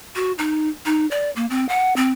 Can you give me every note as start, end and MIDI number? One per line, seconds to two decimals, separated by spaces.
0.16 0.32 66
0.38 0.69 63
0.86 1.06 63
1.11 1.30 74
1.36 1.46 58
1.50 1.67 60
1.69 1.95 78
1.96 2.12 60